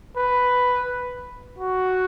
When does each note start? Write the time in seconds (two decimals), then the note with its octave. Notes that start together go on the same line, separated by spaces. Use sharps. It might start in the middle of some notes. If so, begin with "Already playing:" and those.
0.17 B4
1.58 F#4